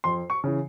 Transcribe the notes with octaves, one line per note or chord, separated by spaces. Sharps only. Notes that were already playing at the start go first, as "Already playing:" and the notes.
F2 C6
C#6
C#3 E3